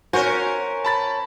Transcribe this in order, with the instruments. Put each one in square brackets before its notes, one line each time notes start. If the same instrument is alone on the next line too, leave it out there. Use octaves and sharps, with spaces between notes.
[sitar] C#4 A#4 C5 [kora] F#4 [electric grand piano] G#5
[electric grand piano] A5 B5 A6